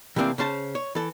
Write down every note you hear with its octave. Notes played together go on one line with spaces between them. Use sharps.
C3 E3 A3 A#3 C4 D4
C#3 C#4 C5 A5
C#5
E3 A4